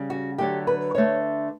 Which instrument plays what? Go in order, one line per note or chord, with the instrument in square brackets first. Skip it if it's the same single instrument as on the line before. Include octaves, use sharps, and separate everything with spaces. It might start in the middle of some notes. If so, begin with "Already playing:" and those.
Already playing: [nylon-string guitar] C#3 G3
F#4
D3 F#3 A3 G4
B4
D3 A3 C#5